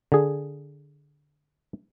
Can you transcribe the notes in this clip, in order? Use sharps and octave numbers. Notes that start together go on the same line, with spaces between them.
D3 G#4